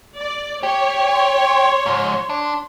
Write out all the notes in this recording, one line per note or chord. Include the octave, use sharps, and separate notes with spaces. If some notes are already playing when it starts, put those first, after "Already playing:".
D5
G4 C#5
C6
G#2 F3
D4